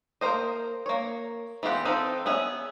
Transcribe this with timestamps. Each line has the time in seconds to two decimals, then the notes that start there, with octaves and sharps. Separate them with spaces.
0.21 A#3 A#4 C5 D#5
0.86 A#3 C#5
1.63 E3 B3 F4 G4 F#5
1.85 C4 D#4 A4 B4 F5
2.26 B3 C#4 G#4 E5